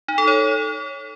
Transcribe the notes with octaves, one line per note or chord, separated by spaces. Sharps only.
D#4
A4
C#5